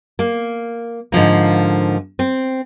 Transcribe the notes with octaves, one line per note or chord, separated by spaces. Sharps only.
A#3
G#2 D3 F3 A#3
C4